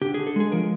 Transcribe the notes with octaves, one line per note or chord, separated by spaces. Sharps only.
D3 G4
G#4
D3
A4
G#3 G#4
F3 A#4